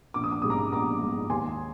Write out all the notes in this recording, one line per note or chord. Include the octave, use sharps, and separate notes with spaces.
A#1 D6
D#6
D6
G#2 G3 D#6
A#5 D6
A#1 A#5 D6
G#2 G3
D#2 G#5 C6